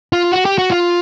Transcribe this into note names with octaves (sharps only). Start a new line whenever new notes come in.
F4
F#4
G4
F#4
F4